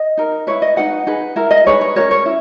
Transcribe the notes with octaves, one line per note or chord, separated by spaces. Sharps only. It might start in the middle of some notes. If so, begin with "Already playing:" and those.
Already playing: D#5
D#4 A#4
E4 B4 C#5
D#5
D#4 G#4 B4 F#5
D#4 G#4 B4
E4 A#4
D#5
D#4 G#4 B4 C#5
C#5
C#4 F#4 A#4 C#5
C#5
E4